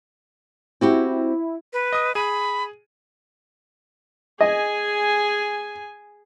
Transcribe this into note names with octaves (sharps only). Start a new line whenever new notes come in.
C4 E4 F#4 G4
B4
D#5 D#6
G#4 B5 D#7
G#4 D#5 G#5